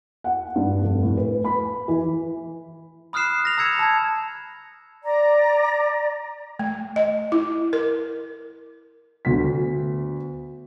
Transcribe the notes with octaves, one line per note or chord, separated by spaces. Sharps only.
F#5
G2
F1
A2
B4
B5
E3
B5 D#6 F6 F#6 C7 E7
A#6 F7
A#5 E6 G#6 C#7 E7
A5 G#6
D5 A#5
A3
D#5
E4
A#4
D2 B3 B6